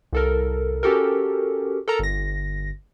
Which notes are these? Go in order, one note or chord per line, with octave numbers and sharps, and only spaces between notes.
C2 A4 A#4
C#4 F#4 G4 A4 A#4
A4 A#4 A#5
G1 A#6